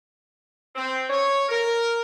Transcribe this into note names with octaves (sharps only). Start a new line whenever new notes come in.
C4
C#5
A#4